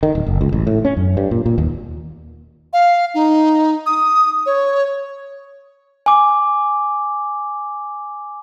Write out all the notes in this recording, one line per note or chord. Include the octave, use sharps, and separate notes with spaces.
D#3
D1
F#1
C#2
A1
A2
C#4
F#2
G2
A#2
A#2
D#2
F5
D#4
D#6
C#5
G#5 D6